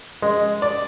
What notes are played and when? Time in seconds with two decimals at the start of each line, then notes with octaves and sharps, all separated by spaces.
0.22 G#3
0.62 D5